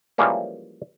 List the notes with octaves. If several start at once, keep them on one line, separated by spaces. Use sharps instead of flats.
E3 F3 G3 G#3 A#3 C#4